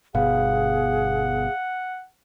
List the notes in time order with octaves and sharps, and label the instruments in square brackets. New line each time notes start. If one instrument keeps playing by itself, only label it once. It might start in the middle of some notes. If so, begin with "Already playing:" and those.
[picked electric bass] G1 B2 [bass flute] G#4 [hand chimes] F5 [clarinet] F#5